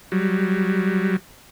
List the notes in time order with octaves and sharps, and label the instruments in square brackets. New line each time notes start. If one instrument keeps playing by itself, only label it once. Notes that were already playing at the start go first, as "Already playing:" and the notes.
[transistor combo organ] F#3 G3